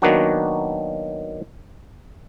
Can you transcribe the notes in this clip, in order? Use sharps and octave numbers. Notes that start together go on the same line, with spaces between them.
D#3 F#3 A#3 B3 D4 F#4